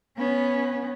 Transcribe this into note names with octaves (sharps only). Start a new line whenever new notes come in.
B3 C#4